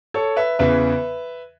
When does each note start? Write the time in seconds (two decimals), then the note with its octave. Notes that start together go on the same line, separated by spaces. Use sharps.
0.14 A4 C#5
0.36 B4 E5
0.59 E2 C#3 E3 B4 E5